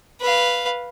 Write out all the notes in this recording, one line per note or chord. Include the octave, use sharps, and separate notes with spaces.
B4 F5